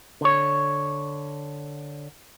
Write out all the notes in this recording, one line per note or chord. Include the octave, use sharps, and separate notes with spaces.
D3 C#5